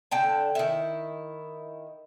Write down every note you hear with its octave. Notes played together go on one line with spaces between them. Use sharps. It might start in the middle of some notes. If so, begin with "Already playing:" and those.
D3 G5 A5
D#3 E4